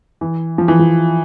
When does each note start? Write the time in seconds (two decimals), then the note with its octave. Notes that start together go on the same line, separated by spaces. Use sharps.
0.21 E3
0.58 F3
0.68 E3
0.79 F3